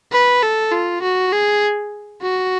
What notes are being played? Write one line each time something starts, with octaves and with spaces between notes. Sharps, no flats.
B4
A4
F4
F#4
G#4
F#4